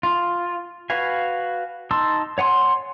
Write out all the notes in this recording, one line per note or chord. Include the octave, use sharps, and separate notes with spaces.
F4
F#4 B4 F5 G#5
D#4 A5 C6 E6
C#5 F#5 G#5 C6